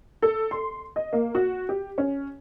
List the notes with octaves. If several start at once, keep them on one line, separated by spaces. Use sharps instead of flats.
A4
C6
D#5
A#3
F#4
G4
C#4